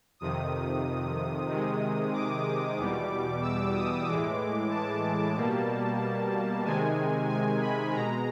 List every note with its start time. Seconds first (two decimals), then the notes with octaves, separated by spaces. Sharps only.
0.20 F2 C3 D#3 D#6
1.49 C3 D#3 G#3
2.13 D6
2.77 E2 B2 G3
3.42 E6
3.74 D#6
4.07 A2 E3 G#3 D6
4.70 A5
5.35 B2 G3 A#3
6.64 C3 D#3 G#3 G#5
7.29 G#5
7.61 B5
7.93 B2 G#3 A#5